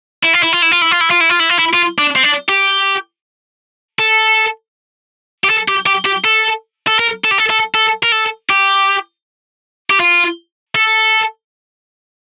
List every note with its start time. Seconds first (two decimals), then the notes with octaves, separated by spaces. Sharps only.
0.23 E4
0.33 F4
0.43 E4
0.52 F4
0.62 E4
0.71 F4
0.82 E4
0.91 F4
1.01 E4
1.10 F4
1.20 E4
1.29 F4
1.39 E4
1.49 F4
1.59 E4
1.74 F4
1.98 D4
2.16 C4
2.24 D4
2.49 G4
3.99 A4
5.44 G4
5.50 A4
5.68 G4
5.86 G4
6.06 G4
6.25 A4
6.88 A4
6.99 A#4
7.25 A4
7.31 G4
7.38 A4
7.50 A4
7.75 A4
8.03 A#4
8.12 A4
8.50 G4
9.90 G4
10.00 F4
10.75 A4